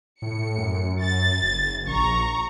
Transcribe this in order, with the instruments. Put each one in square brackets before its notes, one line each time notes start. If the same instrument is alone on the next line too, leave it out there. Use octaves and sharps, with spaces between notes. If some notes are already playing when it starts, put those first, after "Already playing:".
[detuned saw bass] A2 [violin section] C#7
[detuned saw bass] F#2
[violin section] A6
[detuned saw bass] F#1
[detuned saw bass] A#1 [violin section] A#5 C#6